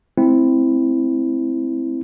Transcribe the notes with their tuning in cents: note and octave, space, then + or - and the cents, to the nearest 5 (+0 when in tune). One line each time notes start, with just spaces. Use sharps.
A3 -35 C4 +0 E4 +0